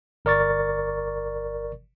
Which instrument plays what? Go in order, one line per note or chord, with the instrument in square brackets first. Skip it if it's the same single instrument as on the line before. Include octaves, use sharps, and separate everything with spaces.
[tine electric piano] G1 A#4 D5 C#6 A6